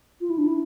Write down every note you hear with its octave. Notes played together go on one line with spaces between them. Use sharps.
F4
E4
D4
E4